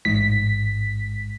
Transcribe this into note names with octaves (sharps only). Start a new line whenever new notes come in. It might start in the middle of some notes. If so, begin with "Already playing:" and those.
A1 G#2 B6